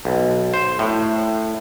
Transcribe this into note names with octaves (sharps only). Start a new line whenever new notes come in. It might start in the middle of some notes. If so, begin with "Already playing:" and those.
B1
C5
A2